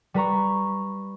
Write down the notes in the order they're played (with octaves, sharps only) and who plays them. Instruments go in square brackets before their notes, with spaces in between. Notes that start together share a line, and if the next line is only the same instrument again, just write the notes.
[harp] G3 B4 A#5 C#6